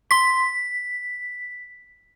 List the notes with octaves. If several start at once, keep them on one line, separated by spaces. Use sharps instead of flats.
C6 B6